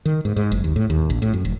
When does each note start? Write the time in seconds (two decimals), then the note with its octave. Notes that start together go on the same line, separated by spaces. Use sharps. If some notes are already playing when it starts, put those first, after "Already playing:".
0.05 D#3
0.25 G#2
0.36 G#2
0.51 F#1
0.64 D#2
0.76 A2
0.90 D#2
1.10 A#1
1.22 A2
1.33 F#2
1.45 F1